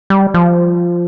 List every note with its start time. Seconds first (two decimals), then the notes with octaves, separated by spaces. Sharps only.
0.10 G3
0.34 F3